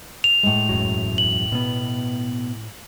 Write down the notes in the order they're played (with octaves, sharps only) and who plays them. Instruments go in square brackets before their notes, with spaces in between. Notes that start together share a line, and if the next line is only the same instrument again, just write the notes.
[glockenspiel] F7
[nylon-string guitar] A2 G#3
[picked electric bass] E1 F#2 F#3
[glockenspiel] F#7
[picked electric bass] B2 B3